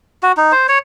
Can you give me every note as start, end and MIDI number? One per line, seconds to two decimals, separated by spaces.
0.23 0.32 66
0.37 0.52 63
0.52 0.67 72
0.69 0.78 73